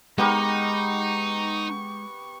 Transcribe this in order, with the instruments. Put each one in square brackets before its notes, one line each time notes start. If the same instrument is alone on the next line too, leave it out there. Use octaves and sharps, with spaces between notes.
[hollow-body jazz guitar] G#3 [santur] B3 G4 A#4 [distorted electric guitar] D#4 [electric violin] C#6